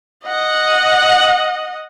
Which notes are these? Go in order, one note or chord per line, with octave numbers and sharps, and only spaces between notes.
D#5 F#5